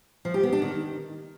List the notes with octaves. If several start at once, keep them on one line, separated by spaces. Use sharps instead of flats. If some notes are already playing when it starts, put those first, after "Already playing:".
F3
G4
B3
D4
D#3